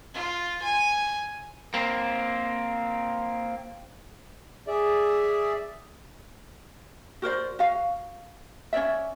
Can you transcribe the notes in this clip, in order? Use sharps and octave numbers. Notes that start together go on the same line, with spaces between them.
F4
G#5
A#3 C4
G#4 D5 E5
F#4 A#4 C5 D5
F#4 F5
C#4 C#5 D5 E5